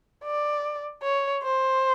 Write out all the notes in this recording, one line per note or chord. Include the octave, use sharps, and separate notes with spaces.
D5
C#5
C5